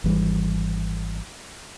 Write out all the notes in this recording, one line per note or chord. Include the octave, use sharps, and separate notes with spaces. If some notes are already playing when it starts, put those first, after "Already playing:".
G#1 E3 G3